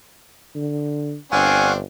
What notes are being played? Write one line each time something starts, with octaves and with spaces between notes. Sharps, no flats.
D3
G1 C4 D4 F5 F#5 G#5 C#6